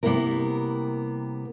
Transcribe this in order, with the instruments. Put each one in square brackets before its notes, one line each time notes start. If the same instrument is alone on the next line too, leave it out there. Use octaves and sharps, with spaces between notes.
[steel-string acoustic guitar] C3 G3 A#3 B3 E4 A#4